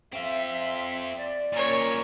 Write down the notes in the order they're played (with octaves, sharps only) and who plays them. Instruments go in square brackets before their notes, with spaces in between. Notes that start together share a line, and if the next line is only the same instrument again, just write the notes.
[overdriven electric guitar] C4 F4 [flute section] E5
[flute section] E5 C6
D5
[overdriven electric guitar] A#2 C#4 [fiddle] A#4 C#5